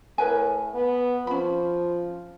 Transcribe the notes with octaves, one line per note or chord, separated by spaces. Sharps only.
A2 A#4 B4 G#5
B3
F3 C#4 B5